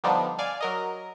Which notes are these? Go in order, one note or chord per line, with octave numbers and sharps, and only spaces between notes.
D3 F3 G3 B3 D4 D#4
D5 F5 G#5
F#3 A#4 D#5